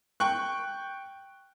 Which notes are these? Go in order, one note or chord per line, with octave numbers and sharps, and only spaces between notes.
G5 C#6 F#6